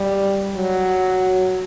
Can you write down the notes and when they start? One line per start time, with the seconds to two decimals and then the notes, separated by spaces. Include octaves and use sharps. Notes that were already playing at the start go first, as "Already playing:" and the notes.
Already playing: G3
0.56 F#3